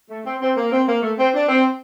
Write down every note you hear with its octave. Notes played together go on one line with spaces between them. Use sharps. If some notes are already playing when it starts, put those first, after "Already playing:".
A3
C4
C4
A#3
C4
A#3
A3
C4
D4
C4